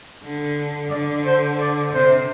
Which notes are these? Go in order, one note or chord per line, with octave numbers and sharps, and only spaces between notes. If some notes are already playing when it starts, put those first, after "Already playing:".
D3
D3 D5
C5
D5
C3 C5